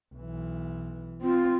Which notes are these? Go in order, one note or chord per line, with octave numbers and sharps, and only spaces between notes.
B1 E3
C4 F4